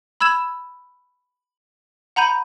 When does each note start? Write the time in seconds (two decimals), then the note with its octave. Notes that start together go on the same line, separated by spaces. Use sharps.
0.21 B5 E6 G#6 E7
2.16 F#5 A#5 B5 G6 D#7